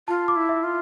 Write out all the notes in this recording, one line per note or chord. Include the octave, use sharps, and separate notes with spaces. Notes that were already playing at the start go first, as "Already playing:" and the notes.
F4 A5
D6
E4
E5
F4